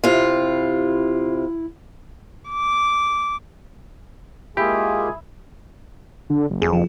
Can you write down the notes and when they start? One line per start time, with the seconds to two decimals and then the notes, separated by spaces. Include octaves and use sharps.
0.04 C3 E4 F4
2.49 D6
4.57 G#3 A#3 E4 F4 G4 G#4
6.30 D3
6.50 F#1
6.62 F2 G#4
6.73 F3